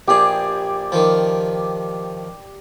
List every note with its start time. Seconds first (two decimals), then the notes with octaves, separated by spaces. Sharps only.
0.08 A#1 G4 G#4 D5
0.92 D#3 F3